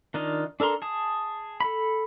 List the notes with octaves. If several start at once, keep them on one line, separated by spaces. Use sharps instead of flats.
D#3 D4 F4 D#5 F5
D4 A4 A#4 A#5 C6
G#4 A5 D#6
A4 B5